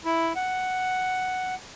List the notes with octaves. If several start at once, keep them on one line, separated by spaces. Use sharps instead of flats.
E4
F#5